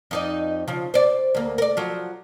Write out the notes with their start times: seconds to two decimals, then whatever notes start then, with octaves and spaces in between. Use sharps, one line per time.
0.11 F2 D#4 D5
0.68 C#3 F3
0.94 C5 D5
1.35 D2 A#3
1.58 A#4 D5
1.77 F3 F#3